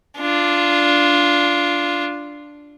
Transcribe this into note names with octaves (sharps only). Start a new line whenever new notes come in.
D4 F4